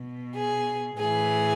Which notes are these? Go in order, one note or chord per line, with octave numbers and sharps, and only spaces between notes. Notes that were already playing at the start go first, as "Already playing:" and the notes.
Already playing: B2
G#4
A2 E3 G#4